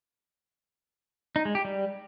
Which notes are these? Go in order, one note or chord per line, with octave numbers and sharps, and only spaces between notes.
D#4
G#3
G4
G3